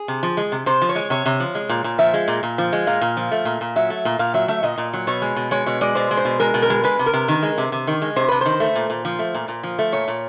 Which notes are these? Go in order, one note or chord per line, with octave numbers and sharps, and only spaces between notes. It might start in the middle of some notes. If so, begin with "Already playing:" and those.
Already playing: G#4
C3
F3
G#3
C3
C3 C5
F3
C#5
G#3
C3 C#5
C3
F3
G#3
A#2
A#2
F3 E5
G#3
A#2
A#2
F3
G#3
A#2 F5
A#2
F3
A3
A#2
A#2
F#3 E5
A3
A#2
A#2 F5
F#3 E5
A3 E5
A#2 D#5
A#2
F#3
B2 C#5
G#3
B2
G#3 C#5
B2 C#5
G#3 D5
B2 C5
G#3
C5
B2
G#3 A#4
B2
A#4
G#3
G#3 B4
C3
A#4
C3
D#3
G#3
C3
C3
D#3
G#3
C3 C5
C3 B4
D#3 C5
A3
A#2
A#2
F3
A3
A#2
A#2
F3
A3
A#2 C#5
A#2